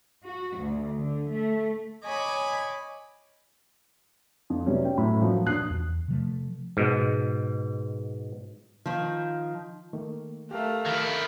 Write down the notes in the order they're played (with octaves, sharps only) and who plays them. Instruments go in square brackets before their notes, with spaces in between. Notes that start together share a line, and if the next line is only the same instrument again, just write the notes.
[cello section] F#4
D2
D3
A3
[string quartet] C#5 D#5 G#5 B5 D6
[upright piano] F2
C3 F#3 G3 B3 C#4
G5
F#2 A2 B5
F3 F#3 A#3 F#4
D#1 G2 D#6 F#6 C7
[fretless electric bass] E2
C3 F3 A3
[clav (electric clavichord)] G#2 B2
[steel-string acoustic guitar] D#3 F3
[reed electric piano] D#3 A3 A#3
[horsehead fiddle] A3 F5 [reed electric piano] G4 A#4
[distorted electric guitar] D#3 E4